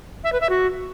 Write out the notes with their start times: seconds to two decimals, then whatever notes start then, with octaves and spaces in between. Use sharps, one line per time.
0.24 E5
0.32 B4
0.41 E5
0.50 F#4